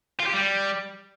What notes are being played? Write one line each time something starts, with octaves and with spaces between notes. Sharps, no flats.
F4
G4
G3